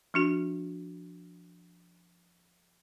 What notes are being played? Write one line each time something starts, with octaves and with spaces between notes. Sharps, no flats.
F3 D4 F#4